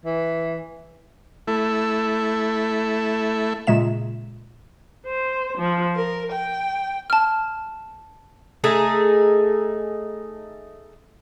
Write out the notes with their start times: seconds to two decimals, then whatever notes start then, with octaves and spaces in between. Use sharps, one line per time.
0.05 E3
1.47 A3 E4
3.67 A#2 C#3 G#3 E5 E7
5.05 C5
5.56 F3
5.96 A#4
6.32 G5
7.10 A5 F6
8.64 A3 D#4 G#4